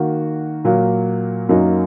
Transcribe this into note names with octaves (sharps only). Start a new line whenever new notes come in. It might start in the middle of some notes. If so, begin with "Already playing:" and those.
Already playing: D#3 A#3 F#4
A#2 F#3 A#3
F#2 F#3 A#3 D#4